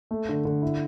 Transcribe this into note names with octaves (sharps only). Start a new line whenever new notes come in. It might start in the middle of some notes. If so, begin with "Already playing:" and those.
A3
D3
D3
E4